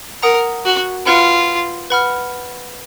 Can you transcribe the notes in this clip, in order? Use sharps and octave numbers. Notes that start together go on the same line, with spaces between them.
A#4 F#5 A#5 D#6
F#4
F4 B4 F#5 B5 F6
B4 F#5 B5 F6